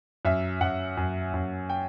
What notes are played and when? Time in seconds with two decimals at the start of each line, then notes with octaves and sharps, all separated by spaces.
0.25 F#2 E5
0.61 F#2 F#5
0.97 F#2
1.34 F#2
1.69 G5